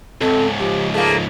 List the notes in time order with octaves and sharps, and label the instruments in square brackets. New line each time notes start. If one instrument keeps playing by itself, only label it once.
[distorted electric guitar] C#2 G#2 [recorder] C4 [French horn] A4
[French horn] F3 [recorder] G4
[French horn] F3 [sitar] A3 A#3 [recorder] G#4